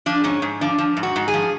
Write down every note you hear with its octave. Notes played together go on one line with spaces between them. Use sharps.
F3 D4
G#2 C#4
G#2
F3 D4
F3
G#2
F#4
G#2
G#4
F3